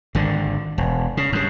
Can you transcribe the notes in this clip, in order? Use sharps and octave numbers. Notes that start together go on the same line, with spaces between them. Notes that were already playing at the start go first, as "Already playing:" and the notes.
G#1 D3
E1
C#3
G2 C#3